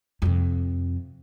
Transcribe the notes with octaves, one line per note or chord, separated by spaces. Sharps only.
F2 C3